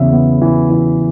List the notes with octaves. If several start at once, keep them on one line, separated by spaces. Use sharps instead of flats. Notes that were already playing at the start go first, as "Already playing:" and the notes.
Already playing: E2 C#3 E3 E5
B3
E3
E3